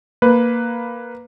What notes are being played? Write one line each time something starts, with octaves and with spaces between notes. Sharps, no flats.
A#3 B4